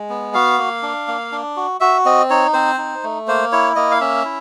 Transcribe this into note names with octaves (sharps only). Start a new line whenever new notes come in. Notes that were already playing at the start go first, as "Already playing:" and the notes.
Already playing: G#3
B3
F#4 F5
A#3
D4
A#3
D4
F#4
F#4 E5
C4 D#5
D#4 C#5
C4 C5
D#4
A3
A#3 C5
E4 C#5
A#3 D#5
F5
C#4 E5
E4